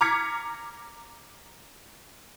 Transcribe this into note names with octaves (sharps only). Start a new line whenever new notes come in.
A#5 D6 F6 G#6 B6 C#7